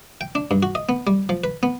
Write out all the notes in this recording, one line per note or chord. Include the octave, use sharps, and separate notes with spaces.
G5
D4
G2
F#4
D#5
B3
G3
F3
B4
B3